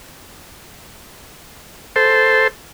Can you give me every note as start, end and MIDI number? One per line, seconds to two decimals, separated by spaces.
1.96 2.48 69
1.96 2.48 72